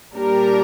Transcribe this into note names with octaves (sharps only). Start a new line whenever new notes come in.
A#2 G3 D4 A#4